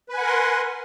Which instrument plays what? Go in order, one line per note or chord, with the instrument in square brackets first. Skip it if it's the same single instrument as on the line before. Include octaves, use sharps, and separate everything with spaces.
[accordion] B4
G#5
F#5
A#4
C6